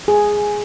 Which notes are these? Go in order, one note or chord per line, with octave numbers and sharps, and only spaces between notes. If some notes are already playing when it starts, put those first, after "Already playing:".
G#4